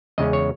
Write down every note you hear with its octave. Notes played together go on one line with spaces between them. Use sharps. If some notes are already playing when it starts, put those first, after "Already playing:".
E2 C#3 G#3 C#4 D#5
C#5